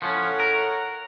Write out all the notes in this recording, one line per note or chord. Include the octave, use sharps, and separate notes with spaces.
A2 F3 C#4 C#5 F#5
A#4